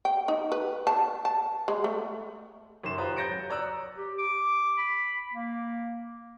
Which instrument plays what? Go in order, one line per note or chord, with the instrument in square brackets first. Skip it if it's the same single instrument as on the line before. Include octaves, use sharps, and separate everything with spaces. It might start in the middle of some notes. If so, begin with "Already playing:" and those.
[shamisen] G5
D#4
B4
A5
A5
G#3
A3
[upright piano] F#2 D#3 C6 E7
F4 G4 B4 C5 A#5 D#6
G6 A6 A#6 C#7 D7
F#3
C#5 D5 A#5 D#6 E6 F#6
[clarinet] G4
D6
B5
A#3